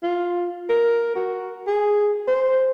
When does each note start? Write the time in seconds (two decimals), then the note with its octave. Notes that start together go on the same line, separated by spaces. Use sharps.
0.03 F4
0.70 A#4
1.15 F#4
1.67 G#4
2.28 C5